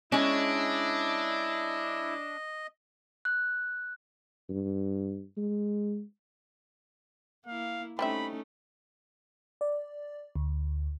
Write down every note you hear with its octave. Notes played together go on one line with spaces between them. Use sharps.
G#3 C#4 D4 E4 D#5
F#6
G2
G#3
A#3 E4 F5
G3 A3 C4 C#4 D#4 E5 B5
D5
D2